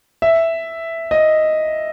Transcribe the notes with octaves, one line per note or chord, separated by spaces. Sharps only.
E5
D#5